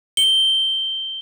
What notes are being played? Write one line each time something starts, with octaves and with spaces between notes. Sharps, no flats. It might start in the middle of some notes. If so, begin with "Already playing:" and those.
G7